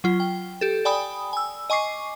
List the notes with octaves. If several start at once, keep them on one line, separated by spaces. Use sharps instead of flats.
F#3 F4
G5
G4 A4
D5 G5 G#5 B5 D#6
G#5 E6
D#5 G#5 C#6 D6 C7